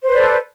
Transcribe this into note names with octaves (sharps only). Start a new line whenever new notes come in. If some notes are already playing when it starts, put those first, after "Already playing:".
A4 B4 C5 D5